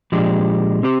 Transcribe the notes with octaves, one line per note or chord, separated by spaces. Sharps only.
A#2 F3 G#3 D4 G4
C4 G4 C5